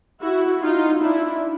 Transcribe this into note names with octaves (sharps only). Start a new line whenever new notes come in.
E4 F#4
D#4 F4
D4 E4